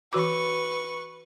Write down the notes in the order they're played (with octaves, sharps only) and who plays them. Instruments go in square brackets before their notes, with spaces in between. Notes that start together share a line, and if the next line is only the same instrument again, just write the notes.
[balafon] E3 F#4 D6 [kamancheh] B4 C#6